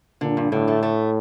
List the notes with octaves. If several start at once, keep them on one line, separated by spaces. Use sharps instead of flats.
A#2 D3
G2
A2 D3
A3
A3